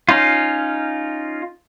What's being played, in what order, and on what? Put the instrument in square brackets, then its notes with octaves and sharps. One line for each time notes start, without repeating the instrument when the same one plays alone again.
[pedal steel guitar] C#4 D#4 F4